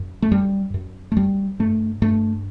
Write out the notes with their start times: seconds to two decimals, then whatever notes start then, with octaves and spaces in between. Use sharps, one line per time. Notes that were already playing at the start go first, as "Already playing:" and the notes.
Already playing: F#2
0.22 A3
0.32 F#2 G3
0.74 F#2
1.12 A3
1.17 F#2 G3
1.59 G2 A3
2.02 G2 A3